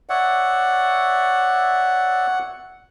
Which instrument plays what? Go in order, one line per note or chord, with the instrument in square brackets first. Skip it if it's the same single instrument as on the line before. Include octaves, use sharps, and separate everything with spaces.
[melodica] C#5 D5 E5 [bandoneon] F#5